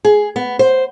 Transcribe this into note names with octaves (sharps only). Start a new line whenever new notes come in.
G#4
B3
C5